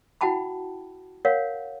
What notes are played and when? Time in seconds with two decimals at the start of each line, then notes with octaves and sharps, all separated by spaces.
0.21 E4 F#4 F#5 G5 A5 B5
1.25 A#4 C#5 F5 F#5